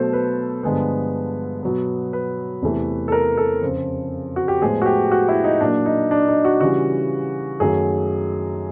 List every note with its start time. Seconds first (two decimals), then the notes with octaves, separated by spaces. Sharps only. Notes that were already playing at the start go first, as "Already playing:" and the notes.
Already playing: B2 F#3 A3 A4 C5
0.13 B4
0.63 G2 D3 F3 G#3 B3
1.63 B2 F#3 B3
2.13 B4
2.62 E2 C3 E3 A3
3.08 A4
3.12 A#4
3.37 A4
3.62 F2 C#3 F3
4.36 F#4
4.48 G4
4.61 A2 F3 G#3 B3 G#4
4.82 F#4
4.86 G4
5.12 F#4
5.29 E4
5.44 D#4
5.61 A#2 F#3 A#3 D4
5.86 D#4
6.11 D4
6.28 D#4
6.45 F#4
6.61 C#3 E3 G3 F#4
7.60 F#2 D#3 F#3 A3 G#4